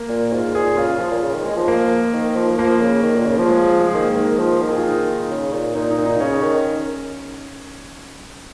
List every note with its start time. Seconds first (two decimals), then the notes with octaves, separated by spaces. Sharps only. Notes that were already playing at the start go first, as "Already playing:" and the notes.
Already playing: A#3
0.09 A#2
0.32 G#2 F4
0.55 A#2 G#4
0.77 C#3 F4
0.88 C#3
1.00 F3
1.11 A#2
1.23 C#3
1.34 D#3
1.45 G#3
1.57 F3
1.68 A#3
2.13 D#3
2.36 F3
2.58 F3 A#3
2.81 C#3
3.03 D#3
3.16 A#2
3.26 C#3
3.38 F3
3.49 G#3
3.80 G#3
3.94 D#3 A#3
4.16 D#3
4.39 F3
4.62 D#3
4.71 G#4
4.78 F4
4.84 D#4
5.31 C#3
5.53 A#2
5.75 A#2 D#4
5.91 D#4
5.98 A#2
6.06 D#4
6.20 C#3 C#4
6.43 D#3